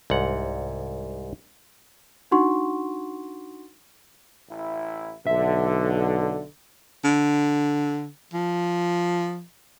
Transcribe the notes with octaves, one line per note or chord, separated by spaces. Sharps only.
C2 G#2 F#5
D4 D#4 F#4 F#5 C6 C#6
A1 E4
B1 D3 E5
D3
F3